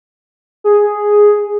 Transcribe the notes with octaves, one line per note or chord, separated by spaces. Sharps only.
G#4